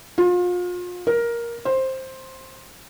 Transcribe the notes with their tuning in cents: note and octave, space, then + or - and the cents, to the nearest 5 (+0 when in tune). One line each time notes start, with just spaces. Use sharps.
F4 +35
A#4 +10
C5 +10